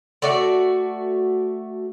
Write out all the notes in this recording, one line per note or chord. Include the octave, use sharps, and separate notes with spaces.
A3 F#4 D5